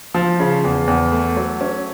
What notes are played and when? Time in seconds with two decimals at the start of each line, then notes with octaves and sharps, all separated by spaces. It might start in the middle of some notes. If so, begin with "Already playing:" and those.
0.14 F3
0.40 C#3
0.64 E2
0.87 E2
1.12 A3
1.37 F#3
1.61 C#4